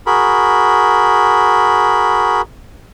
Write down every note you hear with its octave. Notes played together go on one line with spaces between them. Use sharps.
F#4 G#4 A#4 B5